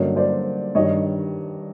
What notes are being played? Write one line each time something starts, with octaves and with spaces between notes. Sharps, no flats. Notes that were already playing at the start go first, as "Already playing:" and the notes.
Already playing: G2 D3 F#3 A#3 C#4 C#5 D#5
C5 D5
G2 D#3 G3 C#5 D#5